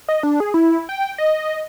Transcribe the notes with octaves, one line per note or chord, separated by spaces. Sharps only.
D#5
D4
G#4
E4
G5
D#5